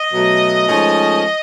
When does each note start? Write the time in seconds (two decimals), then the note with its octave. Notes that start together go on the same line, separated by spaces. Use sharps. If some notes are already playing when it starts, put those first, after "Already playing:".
Already playing: D#5
0.13 B2 F#3 A3
0.67 G#2 F3 A3 C#4